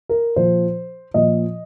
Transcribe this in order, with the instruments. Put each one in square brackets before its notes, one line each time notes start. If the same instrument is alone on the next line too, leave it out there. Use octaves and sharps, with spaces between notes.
[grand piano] A#4
A#2 F3 C5
A#2 F3 D#5